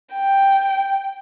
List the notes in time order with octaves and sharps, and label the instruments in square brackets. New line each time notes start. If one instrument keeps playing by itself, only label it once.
[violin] G5